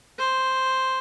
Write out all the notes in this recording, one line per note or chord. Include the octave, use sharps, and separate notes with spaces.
C5